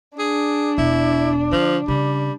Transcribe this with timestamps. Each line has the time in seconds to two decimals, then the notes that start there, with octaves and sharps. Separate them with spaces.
0.19 D4 G#4
0.78 E1 E4
1.52 D3 F3
1.88 C#3 G3